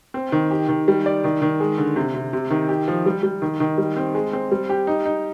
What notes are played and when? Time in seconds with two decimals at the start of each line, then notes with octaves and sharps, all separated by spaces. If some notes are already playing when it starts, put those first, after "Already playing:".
0.14 C4
0.32 D#3
0.51 G4
0.69 D#3
0.88 G3
1.06 D5
1.24 D#3
1.42 D#3
1.60 G#3
1.78 D3
1.96 C3
2.14 C3
2.33 C3
2.50 D#3
2.69 G4
2.88 F3
3.06 G3
3.23 G3
3.42 D#3
3.60 D#3
3.78 G3
3.97 C4
4.14 G#3
4.33 C4
4.51 G3
4.69 G4
4.87 D#4
5.05 D#4